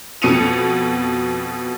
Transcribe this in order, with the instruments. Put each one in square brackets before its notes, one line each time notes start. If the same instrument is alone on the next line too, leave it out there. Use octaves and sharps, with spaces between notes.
[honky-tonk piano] F2 B2 D#6 C#7 D#7 F7